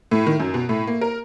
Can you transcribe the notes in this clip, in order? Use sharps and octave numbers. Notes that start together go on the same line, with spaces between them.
A2
D#3
F#2
B2
A2
A#3
A#4